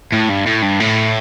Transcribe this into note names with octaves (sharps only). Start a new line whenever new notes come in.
A2
G2
A2
G2
A2